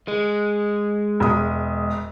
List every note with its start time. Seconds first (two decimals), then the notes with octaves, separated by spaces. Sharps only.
0.08 G#3
1.20 E1 D#6